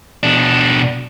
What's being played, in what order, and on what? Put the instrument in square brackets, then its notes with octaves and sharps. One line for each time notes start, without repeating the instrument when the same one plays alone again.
[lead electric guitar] B2 D4